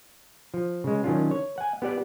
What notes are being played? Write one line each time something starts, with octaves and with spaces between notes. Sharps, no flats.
F3
C#3 G#3
D#3 F#3 C#4 D4 F4
C#5
F#5 G#5
B3 G4 D5 F#5